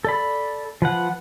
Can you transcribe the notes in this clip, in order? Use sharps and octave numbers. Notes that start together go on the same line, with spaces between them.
A4 D5 B5
F3 B4 F#5